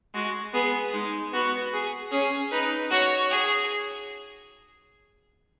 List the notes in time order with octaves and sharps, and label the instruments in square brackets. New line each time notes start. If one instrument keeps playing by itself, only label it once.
[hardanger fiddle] G#3 [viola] F#4
[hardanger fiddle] B3 [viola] G#4
[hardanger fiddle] G#3 [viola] D#4
[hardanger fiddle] B3 [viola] F#4
[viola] G#4
[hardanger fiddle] C#4 [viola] G#4
[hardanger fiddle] D#4 [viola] B4
[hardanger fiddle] F#4 [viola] C#5
[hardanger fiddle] G#4